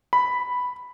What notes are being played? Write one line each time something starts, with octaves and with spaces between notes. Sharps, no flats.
B5